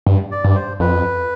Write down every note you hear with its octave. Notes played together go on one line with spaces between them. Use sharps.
G2
D5
G2
D5
C5
F2 B4